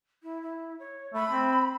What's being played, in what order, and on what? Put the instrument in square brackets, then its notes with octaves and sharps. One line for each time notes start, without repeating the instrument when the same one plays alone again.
[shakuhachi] E4
E4
C#5
[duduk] A3 [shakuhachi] B5
[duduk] C4